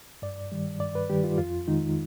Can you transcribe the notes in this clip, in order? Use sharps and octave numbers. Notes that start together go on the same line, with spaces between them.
G2 D5
D#3 G3
G2 D5
B4
D#3 G3 G4
F4
F2 F4
D#3 G#3 D#4